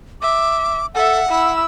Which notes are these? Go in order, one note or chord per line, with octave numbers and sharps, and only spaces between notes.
E5 D6
A4 E5 F#5
E4 E6